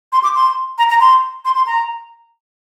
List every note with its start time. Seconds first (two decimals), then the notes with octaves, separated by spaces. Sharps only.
0.12 C6
0.23 D6
0.35 C6
0.78 A#5
0.89 A#5
1.00 C6
1.45 C6
1.56 C6
1.66 A#5